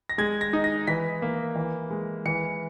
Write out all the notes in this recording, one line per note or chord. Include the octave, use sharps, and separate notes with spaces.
A#6
G#3 G#6
A#6
D#4
A#6
E3 B6
A#3
E3
G#3
E3 C#7